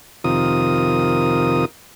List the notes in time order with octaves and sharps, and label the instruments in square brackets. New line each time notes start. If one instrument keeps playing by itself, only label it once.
[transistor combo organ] F2 C3 D#3 F4 A#4 D#6